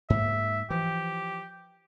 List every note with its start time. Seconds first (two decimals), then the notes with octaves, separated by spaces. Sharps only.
0.10 G#2 A#3 E5
0.70 E3 F3 G4